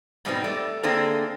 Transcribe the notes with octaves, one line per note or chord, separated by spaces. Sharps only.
G#2 B2 G3 B3 C4 D#4
A3 D5
D3 A#3 C4 D4 G#4 A4